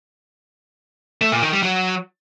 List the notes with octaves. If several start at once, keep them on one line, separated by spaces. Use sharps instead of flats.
A3
A#2
D#3
G3
F#3